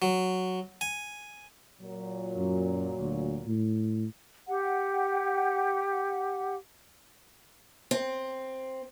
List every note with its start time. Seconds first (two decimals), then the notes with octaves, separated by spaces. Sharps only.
0.02 F#3
0.81 G#5
1.81 A#2 F#3
2.36 F#2
2.99 D2
3.47 A2
4.47 G4 F#5
7.91 C4